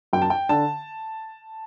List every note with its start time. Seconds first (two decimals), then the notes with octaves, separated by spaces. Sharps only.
0.13 F#2 G5
0.22 A5
0.30 G5
0.49 D3 A5